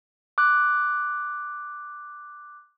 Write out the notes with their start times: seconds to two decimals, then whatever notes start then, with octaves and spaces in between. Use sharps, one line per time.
0.38 D6 F#6